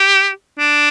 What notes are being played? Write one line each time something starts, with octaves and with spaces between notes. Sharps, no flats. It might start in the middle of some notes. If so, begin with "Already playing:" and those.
Already playing: G4
D4